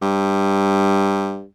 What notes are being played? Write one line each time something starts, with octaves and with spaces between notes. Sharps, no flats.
G2